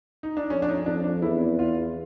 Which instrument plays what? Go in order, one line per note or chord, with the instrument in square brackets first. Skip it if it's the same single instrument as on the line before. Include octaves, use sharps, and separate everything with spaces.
[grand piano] D#4
D4
[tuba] F2 [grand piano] C#4
[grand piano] D4
D#4
[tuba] F2 [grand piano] D4
[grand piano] D4
[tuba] E2 [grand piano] E4
[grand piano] F4